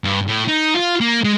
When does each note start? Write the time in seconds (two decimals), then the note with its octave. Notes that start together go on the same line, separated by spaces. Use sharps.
0.04 G2
0.28 A2
0.48 D#4
0.74 F4
1.01 A#3
1.24 G#3